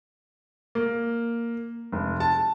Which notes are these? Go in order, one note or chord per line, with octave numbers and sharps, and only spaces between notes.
A#3
F1
A5